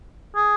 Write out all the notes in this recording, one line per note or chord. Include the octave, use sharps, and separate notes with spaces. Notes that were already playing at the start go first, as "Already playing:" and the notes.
G#4